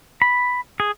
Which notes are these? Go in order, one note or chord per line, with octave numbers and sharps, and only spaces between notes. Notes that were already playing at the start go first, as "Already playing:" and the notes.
B5
G#4